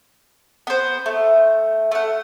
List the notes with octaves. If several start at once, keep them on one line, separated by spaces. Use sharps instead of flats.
B3 C5
A3
A3 F#5